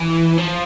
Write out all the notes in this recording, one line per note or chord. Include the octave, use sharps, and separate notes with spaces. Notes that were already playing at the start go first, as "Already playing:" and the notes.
Already playing: E3
F3